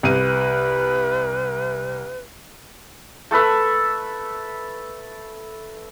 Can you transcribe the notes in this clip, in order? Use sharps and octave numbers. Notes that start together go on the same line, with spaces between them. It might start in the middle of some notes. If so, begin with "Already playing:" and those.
C2 B4 D#7
A3 A4 B4 E5